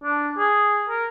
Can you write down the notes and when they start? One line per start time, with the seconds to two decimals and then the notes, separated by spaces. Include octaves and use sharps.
0.03 D4
0.38 G#4
0.89 A#4